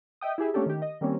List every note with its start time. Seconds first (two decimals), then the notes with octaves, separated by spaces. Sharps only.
0.21 D#5 E5 G5 D#6
0.38 E4 G4 G#4 E5
0.54 A3 A#3 C#4 D4 G4 A4
0.66 D#3 G4
0.82 D#5
1.01 D#3 G3 A#3 C4 C#4